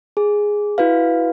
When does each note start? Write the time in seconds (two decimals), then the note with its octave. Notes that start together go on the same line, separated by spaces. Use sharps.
0.17 G#4
0.78 E4 F#4 B4 F5